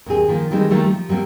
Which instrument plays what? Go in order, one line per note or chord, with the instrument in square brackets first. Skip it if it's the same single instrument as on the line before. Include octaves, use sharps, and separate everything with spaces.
[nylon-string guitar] D#2 C4 G#4
D#3 F3 A#3
D#3 E3 G3 G#3 C4 D#4
D#3 F#3 G3 A3 A#3
F3
F#3 G3 A#3 C4